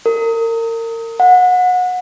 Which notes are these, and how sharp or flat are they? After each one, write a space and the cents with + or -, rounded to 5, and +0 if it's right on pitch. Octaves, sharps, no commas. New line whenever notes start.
A#4 -35
F#5 -25